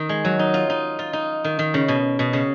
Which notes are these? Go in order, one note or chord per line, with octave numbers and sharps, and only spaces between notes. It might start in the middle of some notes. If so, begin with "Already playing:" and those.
Already playing: D#3
G#3
F#3
D#4
F4
D#4
F4
D#4
D#3
D#3
C#3
B2
B2
C#3